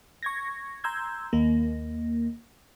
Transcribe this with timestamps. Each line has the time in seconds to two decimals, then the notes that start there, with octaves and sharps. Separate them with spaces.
0.23 C#6 G#6 A#6
0.84 A#5 C6 E6 G6 G#6
1.33 D#2 A#3